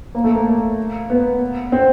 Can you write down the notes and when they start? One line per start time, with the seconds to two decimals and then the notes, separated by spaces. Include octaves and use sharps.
0.15 A#3
0.24 A3
0.35 A#3
1.10 B3
1.72 C4